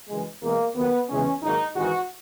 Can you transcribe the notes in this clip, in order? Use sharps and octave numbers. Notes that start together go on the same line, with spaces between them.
F#2 C#3 E3 G#3
E2 B2 G#3 A#3
D#2 D#3 F#3 B3
E2 C#3 E3 G#3 C#4
G#1 G#2 D#3 F#3 A#3 D#4
G#1 G#2 E3 G#3 F#4